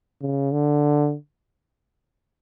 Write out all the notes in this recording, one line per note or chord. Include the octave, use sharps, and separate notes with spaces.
C#3
D3